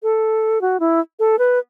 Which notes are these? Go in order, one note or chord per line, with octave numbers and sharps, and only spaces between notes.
A4
F#4
E4
A4
B4